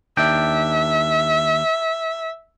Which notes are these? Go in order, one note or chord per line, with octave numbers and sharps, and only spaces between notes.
D#2 D4 E5 G5